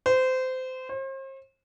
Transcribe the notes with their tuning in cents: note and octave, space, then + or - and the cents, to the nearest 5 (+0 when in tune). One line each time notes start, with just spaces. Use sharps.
C5 -25
C5 +40